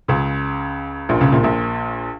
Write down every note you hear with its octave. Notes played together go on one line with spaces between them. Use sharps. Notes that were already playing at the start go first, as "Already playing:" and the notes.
C#2 C#3
A#1 A#2
C#2 C#3
A#1 A#2
A#1 A#2